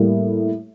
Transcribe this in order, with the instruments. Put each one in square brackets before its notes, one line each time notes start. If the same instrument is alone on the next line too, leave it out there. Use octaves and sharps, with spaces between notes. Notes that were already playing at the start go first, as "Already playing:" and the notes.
Already playing: [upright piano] A2 G3 A#3